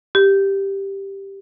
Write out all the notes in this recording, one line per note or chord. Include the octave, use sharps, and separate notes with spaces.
G4